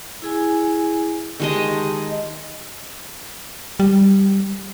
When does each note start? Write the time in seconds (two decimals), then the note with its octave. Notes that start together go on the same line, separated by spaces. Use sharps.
0.22 E4 G#4 G#5
1.40 D#3 G#3 G4 D#5 A5
3.80 G3